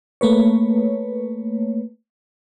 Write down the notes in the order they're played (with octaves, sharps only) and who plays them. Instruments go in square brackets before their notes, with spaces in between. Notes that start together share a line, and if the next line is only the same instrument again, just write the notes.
[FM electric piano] A3 A#3 B4 C#5